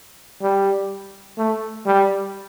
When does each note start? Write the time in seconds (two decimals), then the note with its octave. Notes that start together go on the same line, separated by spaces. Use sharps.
0.42 G3
1.38 A3
1.86 G3